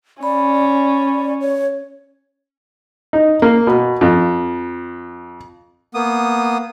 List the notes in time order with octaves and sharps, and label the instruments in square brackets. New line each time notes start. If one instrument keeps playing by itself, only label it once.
[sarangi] C#4 [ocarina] D5 [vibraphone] B5
[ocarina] C#5
[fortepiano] D#4
A#3
B2
F2
[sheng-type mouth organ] A#3 B3 D#6